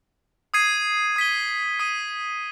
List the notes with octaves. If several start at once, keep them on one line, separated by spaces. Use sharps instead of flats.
D#6 G#6 C7 D#7
D#6 B6 D#7 G7
D#6 B6 D#7 G7